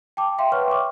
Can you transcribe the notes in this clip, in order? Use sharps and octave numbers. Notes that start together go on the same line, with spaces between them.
G5 A5 D6
E5 F5 G5 C6
B4 C#5 F#5 C#6 F6
D6